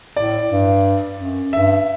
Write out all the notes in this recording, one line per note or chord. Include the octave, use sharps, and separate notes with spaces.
A2 D5
G2
F#2
G2 E5